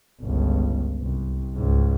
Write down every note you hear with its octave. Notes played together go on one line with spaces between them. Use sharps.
G1 C#2
C2
C#2 G#2